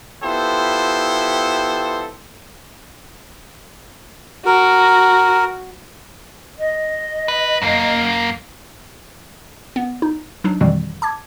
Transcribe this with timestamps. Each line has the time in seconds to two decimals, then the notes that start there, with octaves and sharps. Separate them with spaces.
0.23 B3 E4 F4 G4 A4 C5
4.46 F#4 A#4
6.58 D#5
7.28 B4
7.62 F#2 A#3
9.76 B3
10.02 D#4
10.44 F#3 D4 D#4
10.61 F2 B2 D#3 E3 G3
11.02 A5 D6 G#6